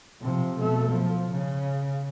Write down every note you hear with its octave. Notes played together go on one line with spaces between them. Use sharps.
C3 F3
B2 A3
F3
C#3